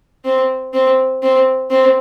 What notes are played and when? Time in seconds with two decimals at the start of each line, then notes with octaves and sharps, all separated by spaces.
0.25 C4
0.73 C4
1.23 C4
1.70 C4